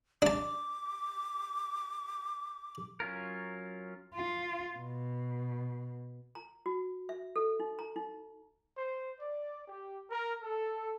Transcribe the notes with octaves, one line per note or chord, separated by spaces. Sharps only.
D4 A5 D6
F#3 C#4 F4 A#4
F4
B2
A#5
F#4
E5
A4
D#4
A#5
D#4
C5
D5
G4
A#4
A4